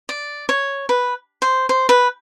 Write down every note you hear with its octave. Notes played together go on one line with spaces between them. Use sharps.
D5
C#5
B4
C5
C5
B4